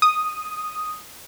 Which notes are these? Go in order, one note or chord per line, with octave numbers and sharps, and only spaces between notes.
D#6